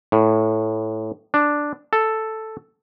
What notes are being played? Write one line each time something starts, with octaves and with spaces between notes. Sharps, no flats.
A2
D4
A4